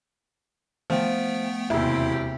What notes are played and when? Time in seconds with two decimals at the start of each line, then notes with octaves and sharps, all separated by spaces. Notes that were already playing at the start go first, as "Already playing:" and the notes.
0.90 F3 A3 B3 G5
1.70 E1 D#2 C3 E4 G4 E5